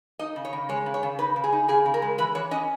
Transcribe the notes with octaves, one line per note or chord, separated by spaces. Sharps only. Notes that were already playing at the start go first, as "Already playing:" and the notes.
D#4 D#5
C#3
C#5
C#3
G#3 C#5
C#3
C#5
C#3
D#4 B4
C#3
G#4
D#4
C#3 G#4
C#3
A#4
G#3
E3 B4
E3 C#5
C#4 D#5